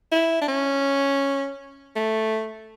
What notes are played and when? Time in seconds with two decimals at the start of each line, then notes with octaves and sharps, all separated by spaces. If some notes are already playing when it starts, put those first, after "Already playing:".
0.12 E4
0.41 D4
0.48 C#4
1.96 A3